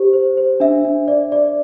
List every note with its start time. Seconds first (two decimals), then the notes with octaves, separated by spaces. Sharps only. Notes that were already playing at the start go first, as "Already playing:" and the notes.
Already playing: G4 C5
0.13 C5
0.37 C5
0.60 D4 E5
0.85 D4
1.08 D5
1.32 D5